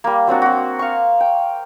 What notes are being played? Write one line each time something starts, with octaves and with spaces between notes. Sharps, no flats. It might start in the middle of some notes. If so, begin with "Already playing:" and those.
G3 A#3
F#3 C4 D4 F#4
C4 F#4
F5 C#6
G5